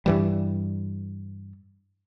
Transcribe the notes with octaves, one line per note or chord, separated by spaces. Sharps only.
G2 E3 G3